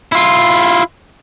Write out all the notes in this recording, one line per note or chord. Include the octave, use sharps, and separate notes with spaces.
E4 F4